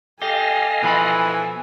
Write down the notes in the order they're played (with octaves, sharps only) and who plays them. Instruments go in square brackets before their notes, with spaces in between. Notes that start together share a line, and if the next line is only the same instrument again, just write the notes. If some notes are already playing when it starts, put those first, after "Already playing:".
[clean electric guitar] G4 [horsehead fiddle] A4 G#5 [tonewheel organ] D#5 F5
[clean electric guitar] B2 F3 B5 [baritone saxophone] E3